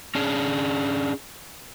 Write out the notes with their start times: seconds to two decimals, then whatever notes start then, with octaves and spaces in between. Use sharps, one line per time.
0.15 C#4 D4 G#4